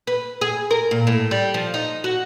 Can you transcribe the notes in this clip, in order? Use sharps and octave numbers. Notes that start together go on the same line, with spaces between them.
B4
G#4
A#4
A#2
A2
G3
F3
D#4
F#4